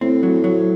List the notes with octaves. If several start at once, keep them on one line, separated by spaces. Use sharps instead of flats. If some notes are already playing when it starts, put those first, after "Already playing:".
A2 C4
F#3
F#3